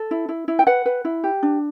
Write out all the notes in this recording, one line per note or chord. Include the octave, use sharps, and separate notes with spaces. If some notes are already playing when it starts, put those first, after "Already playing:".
Already playing: A4
E4
E4
E4
G5
B4 F#5
B4
E4
G4
D4